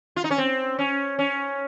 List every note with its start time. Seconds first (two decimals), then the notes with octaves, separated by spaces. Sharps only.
0.16 F4
0.24 D#4
0.31 C#4
0.38 C4
0.79 C#4
1.19 C#4